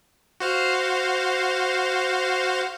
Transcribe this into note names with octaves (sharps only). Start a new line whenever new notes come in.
F#4 C5 F5